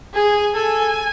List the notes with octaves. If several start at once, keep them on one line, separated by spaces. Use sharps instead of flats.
G#4 G#5
A4 G#5